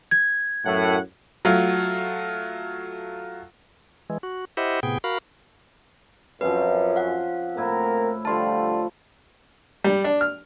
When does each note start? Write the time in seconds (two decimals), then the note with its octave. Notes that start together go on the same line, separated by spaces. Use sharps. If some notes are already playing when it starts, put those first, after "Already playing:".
0.11 G#6
0.66 F#2 A2 F#5
1.45 F#3 A3 F4
4.10 E3 G#3
4.23 F#4
4.57 E4 G4 C5 D#5 E5 F#5
4.83 A2 C3 B3 G#4 G5
5.04 F#4 A#4 F5 B5
6.41 F#2 F3 C4 C#4 B4
6.96 F5 F#5
7.57 A2 A#3 C4 E4 A#4
8.25 D3 F3 G3 A3 F4 A5 C6
9.84 G3
10.04 D4
10.21 F6